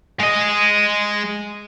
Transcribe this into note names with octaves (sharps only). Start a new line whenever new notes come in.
G#3 D#5